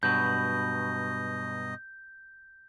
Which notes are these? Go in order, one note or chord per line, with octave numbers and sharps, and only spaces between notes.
G2 B2 F#3 D#5 G6